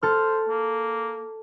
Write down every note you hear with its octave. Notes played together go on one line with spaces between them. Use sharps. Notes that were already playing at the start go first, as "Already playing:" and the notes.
A4 C5 F6
A#3